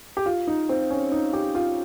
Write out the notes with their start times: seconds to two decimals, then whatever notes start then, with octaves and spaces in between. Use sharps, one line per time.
0.17 G4
0.26 F4
0.47 D#4
0.69 C4
0.90 C#4
1.12 D#4
1.33 G4
1.55 F4